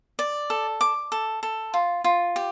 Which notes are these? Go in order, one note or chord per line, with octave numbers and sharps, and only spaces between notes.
D5
A4
D6
A4
A4
F4
F4
G4